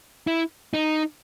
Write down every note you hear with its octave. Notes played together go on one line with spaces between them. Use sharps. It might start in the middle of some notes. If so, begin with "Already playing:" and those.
E4
D#4